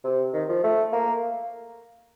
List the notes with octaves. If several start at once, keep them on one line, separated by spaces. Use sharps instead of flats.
C3
D#3
F3
A3
A#3